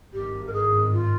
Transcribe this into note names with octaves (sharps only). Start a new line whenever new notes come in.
G#1 G2 D#3 G4
A#4
G#4
F4